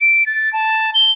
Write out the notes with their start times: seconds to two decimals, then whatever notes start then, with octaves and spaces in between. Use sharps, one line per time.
0.01 D7
0.26 A6
0.53 A5
0.94 G7